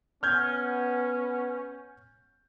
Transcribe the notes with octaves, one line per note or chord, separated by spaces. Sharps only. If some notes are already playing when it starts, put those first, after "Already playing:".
B3 C#4 F6 G6 G#6